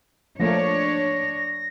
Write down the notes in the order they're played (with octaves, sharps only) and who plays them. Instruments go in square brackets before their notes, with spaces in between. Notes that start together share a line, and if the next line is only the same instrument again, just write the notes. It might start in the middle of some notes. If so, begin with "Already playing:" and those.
[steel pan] F3 A3 A#3 [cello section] D4 C#5 [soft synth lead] A#6